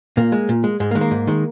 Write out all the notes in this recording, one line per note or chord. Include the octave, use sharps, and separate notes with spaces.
A#2 A#3
G#3
A#2
G#3
G#2 G#3
A#3
D#3 G#3
A#3
G#2
D#3 G#3